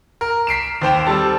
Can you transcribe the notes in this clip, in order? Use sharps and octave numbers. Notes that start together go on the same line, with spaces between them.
A#4
B6 C7 D7 E7
D#2 C5 G5 E7
G3 C4 A4 A5